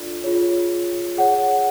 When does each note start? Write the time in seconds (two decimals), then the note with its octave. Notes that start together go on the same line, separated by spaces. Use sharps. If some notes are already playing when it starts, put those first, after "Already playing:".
Already playing: D4 F4 A4 D5
0.24 F4 G#4 C#5
1.17 G#4 C#5 F#5